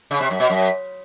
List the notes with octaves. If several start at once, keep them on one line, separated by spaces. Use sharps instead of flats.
C#3
C3
F#2
B2
F#2